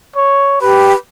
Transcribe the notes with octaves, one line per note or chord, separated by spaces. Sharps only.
C#5
G4 B4